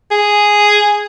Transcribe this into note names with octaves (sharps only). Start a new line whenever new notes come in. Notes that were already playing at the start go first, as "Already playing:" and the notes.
G#4